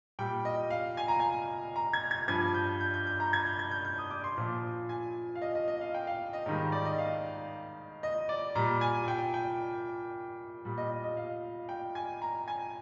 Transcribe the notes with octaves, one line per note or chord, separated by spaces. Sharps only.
A#2 G3 G5
D#5
F5
G#5
A#5
G#5
A#5
G#6
G#6
G2 F3 G#6
G6
G6
G6
G6
A#5
G#6
G6
G#6
G6
G6
D#6
D6
C6
A#2 F3
G#5
F5
D#5
D#5
D#5
F5
G5
F5
D#5
G#2 D#3 G3
D5
D#5
F5
D#5
D5
A#2 G3 A#5
G#5
G5
G5
A#2 G3
D#5
D#5
D#5
F5
G5
G#5
A#5
G#5